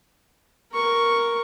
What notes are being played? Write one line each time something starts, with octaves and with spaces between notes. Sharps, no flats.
A#4 C#6